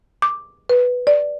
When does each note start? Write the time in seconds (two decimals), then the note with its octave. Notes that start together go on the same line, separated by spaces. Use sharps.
0.22 D6
0.69 B4
1.07 D5